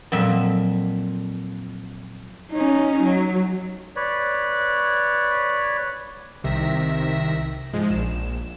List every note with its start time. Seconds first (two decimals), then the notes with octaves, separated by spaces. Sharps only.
0.12 F2 A#2 F#3 E5
2.52 C#4 D#4
3.03 F#3
3.96 B4 C#5 D5
6.44 C2 C3 D#3 E5 A#6 B6
7.73 G#2 F3 G#3
7.90 A#1 E7